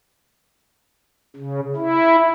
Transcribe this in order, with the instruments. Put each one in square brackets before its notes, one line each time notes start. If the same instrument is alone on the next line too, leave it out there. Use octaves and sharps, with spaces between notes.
[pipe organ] C#3
E4